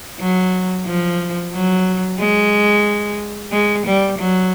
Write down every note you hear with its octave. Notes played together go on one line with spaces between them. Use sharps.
F#3
F3
F#3
G#3
G#3
G3
F#3